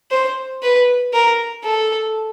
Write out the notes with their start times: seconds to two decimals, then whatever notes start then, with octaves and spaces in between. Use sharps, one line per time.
0.11 C5
0.63 B4
1.13 A#4
1.64 A4